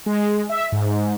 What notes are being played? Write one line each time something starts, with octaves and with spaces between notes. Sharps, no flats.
G#3
E5
G#2